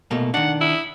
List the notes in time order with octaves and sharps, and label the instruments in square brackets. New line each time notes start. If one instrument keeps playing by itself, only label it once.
[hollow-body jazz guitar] B2 A3 A#3
[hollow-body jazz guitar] D#3 D4 [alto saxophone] F#5
[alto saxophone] E4